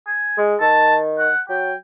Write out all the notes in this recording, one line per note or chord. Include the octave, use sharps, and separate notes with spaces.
G#5
G#3
D#3 A5
F#5
F#3 G5